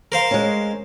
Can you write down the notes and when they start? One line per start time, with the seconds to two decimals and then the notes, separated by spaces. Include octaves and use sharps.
0.12 A#4 C5 F5
0.31 G#3 C#4